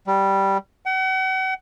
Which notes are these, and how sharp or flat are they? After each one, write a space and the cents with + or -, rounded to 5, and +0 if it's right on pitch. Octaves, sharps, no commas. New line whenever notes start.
G3 -5
F#5 +40